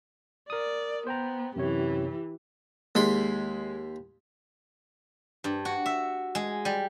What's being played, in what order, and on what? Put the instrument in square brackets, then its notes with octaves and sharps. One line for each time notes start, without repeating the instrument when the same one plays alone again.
[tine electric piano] A#4 D#6 [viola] D5
[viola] B3 [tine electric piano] C5 G5 A#5
[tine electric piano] F#2 C3 C#5 [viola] E3 G4
[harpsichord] D#2 B5 C6 [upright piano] G#3
[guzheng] G2
F#4
E5
G#3
G3